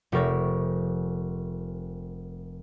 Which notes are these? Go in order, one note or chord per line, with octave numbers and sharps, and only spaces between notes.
F1 G4 A#4 C#6 A6